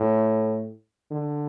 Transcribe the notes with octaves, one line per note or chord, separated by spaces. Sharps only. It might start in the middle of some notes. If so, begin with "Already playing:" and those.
Already playing: A2
D3